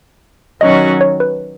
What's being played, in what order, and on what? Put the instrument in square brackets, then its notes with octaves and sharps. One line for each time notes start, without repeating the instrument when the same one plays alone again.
[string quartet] D#3 F#3 C#4 F#4 [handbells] D#5
[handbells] C#5
B4